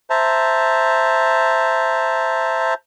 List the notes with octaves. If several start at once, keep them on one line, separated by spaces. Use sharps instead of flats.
C5 E5 A5 A#5